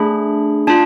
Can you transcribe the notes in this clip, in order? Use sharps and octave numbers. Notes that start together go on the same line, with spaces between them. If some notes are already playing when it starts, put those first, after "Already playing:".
Already playing: A3 D4 G#4 B5
D4 F4 A5